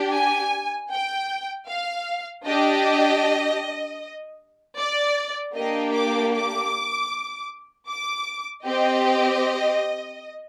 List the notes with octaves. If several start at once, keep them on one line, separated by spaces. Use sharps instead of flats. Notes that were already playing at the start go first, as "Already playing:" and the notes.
Already playing: D4 G4
G#5
G5
F5
D4 G4 D#5
D5
A#3 D4 G4 D#5
D6
D6
D6
C4 G4 D#5